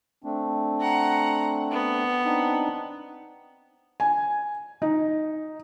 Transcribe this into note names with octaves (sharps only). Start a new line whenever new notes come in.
A3 C4 D4
F#5 A#5
B3
C4 D4 D#4
G#5
D#4